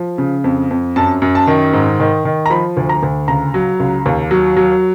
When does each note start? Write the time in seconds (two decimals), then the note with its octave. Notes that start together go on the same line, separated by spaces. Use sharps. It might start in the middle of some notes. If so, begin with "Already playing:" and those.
Already playing: F3
0.18 C#3
0.44 F2
0.71 F2
0.96 F#2 A5
1.22 F#2
1.35 A5
1.47 D#3
1.73 G#2
2.00 D#3
2.25 D#3
2.46 A#5
2.50 F3 B5
2.77 D2
2.89 A#5
3.03 D2
3.28 C#2 A#5
3.54 F#3
3.80 C#2
4.06 D#2
4.31 F#3
4.57 F#3